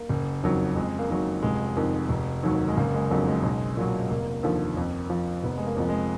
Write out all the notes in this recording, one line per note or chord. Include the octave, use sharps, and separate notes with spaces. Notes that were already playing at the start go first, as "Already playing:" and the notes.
Already playing: A#3
F#1
F2 D#3 F#3
F2 G#3
A#3
D#3 F#3
F1 G#3
F2 D#3
F1
D#2 D#3 F#3
G#3
F#1 A#3
G#3
F2 D3 F#3 A#3
G#3
B1
A#2 F#3
F1 A#3
D#2 D3 F3
F2
F3
F1 B3
G#3
A#3
F2 F3
G#3